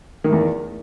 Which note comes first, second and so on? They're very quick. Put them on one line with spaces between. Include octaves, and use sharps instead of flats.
D#3 A2 E2